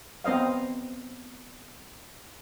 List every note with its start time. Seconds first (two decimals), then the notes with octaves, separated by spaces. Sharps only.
0.24 B3 C4 C5 D#5 F5